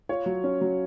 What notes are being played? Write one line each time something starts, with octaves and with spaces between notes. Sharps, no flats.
F4 C#5
F#3
C#4
F#3